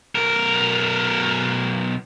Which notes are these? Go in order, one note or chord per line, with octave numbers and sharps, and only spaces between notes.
B1 A#4